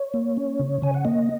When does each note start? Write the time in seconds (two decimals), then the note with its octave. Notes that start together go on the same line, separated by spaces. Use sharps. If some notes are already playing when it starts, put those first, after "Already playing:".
Already playing: C#5
0.14 A#3
0.37 C#4
0.59 C#3
0.82 C#3 G#5
0.94 F#5
1.05 A#3 D#5